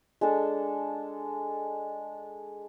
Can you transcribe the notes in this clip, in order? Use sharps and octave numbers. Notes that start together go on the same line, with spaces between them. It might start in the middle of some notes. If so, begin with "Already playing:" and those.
G#3 D4 A4